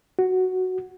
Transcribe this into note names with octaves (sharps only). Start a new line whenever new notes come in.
F#4